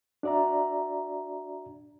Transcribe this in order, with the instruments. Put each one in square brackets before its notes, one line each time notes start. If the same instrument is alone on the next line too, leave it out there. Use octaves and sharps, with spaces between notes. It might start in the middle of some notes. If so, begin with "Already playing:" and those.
[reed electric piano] D4 F#4 D5 E5 A#5